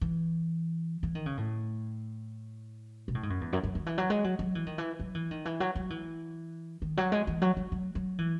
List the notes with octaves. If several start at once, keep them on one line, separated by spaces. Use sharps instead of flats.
E3
E3
D#3
C#3
A2
B2
A2
G#2
F#2
E2
F#2
F#2
D#3
E3
F#3
G#3
F#3
F#3
E3
D#3
E3
F#3
E3
D#3
E3
F#3
F#3
E3
D#3
F#3
G#3
E3
F#3
F#3
F#3
F#3
E3